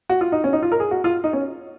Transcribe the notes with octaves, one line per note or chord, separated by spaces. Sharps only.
F#4
F4
D#4
C#4
D#4
F4
A#4
G#4
F#4
F4
D#4
C#4